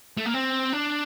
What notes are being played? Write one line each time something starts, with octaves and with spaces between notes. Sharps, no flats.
A3
A#3
C4
D4